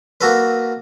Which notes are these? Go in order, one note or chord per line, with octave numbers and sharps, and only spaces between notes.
A#3 F#4 A4 B4